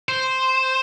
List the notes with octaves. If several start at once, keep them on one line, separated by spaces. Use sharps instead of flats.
C5